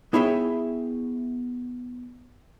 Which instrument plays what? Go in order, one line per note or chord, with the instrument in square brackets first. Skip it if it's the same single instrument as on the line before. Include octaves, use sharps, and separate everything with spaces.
[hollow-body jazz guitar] B3 E4 G#4 C#5 E5 G5